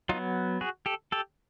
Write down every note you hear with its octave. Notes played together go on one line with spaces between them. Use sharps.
F#3 B3 D#4 F4
F#4 G#4
G4 A4
G4 A4